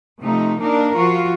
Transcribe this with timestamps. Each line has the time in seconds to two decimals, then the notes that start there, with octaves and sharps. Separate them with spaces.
0.21 C3 F3 A3 D#4
0.60 A#3 D4 D#4 A#4
0.96 F3 F4 F#4